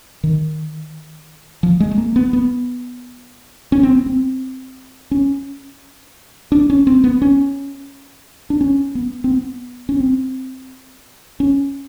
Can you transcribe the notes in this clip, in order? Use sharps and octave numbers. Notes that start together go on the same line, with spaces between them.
D#3
F3
G#3
A3
A#3
B3
B3
C#4
C4
B3
C4
C#4
D4
C#4
C4
B3
C#4
D4
C#4
B3
C4
B3
C#4
C4
C#4